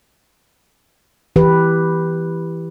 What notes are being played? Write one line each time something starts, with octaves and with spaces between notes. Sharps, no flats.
E3 G4 B4